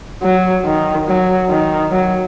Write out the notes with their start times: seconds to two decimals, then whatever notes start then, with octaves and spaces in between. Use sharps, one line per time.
0.23 F#3
0.65 D#3
1.07 F#3
1.50 D#3
1.92 F#3